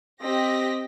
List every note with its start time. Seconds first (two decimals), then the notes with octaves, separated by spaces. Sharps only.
0.21 C4 G4 D#5 A#6 B6